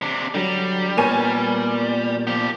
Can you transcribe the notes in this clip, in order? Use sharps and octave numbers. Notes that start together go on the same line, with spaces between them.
C3 D4
D3 F#3 G3
A#2 B3 A#4 C#5 G#5 D#7
F3 G4